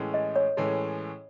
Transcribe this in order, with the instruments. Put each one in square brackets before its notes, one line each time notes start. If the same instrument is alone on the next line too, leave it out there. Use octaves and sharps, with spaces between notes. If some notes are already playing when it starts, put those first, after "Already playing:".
Already playing: [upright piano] A2 E3 G#3 C#4
[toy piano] D#5
C#5
[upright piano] A2 E3 G#3 C#4